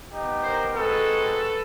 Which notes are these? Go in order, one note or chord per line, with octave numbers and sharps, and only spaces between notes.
B3 D#4 G4
A#4 C5
G#3 C4 D#4 F#4 A4 B4